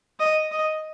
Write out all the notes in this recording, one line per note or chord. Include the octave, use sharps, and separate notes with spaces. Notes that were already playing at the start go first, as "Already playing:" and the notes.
D#5
D#5